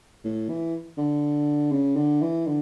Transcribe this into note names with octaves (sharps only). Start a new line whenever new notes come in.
A2
E3
D3
C#3
D3
E3
D3